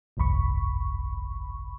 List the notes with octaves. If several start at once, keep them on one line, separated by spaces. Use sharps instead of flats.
G1 C2 F2 B5 C#6